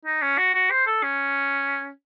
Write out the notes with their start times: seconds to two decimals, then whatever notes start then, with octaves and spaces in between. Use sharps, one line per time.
0.05 D#4
0.22 C#4
0.38 F#4
0.54 F#4
0.71 C5
0.87 A4
1.03 C#4